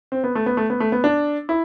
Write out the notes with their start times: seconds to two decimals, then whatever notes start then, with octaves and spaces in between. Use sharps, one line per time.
0.12 C4
0.24 B3
0.35 A3
0.46 B3
0.57 A3
0.70 B3
0.80 A3
0.92 B3
1.04 D4
1.49 E4